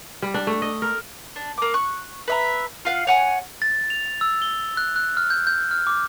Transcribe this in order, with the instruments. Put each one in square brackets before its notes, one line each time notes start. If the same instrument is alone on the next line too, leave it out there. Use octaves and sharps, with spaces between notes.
[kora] G3
D4
A3
D#5
A#4
[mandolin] D4
A#3 D6
C#6 F#6
B4 E5 A#5
F4 F5 F#5
C#5 F#5 G#5
[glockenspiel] A6
F7
E6
G7
F#6
F#6
F6
G6
G6
F6
D6